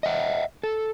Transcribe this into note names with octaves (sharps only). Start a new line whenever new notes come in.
D#5 E5 F#5
A4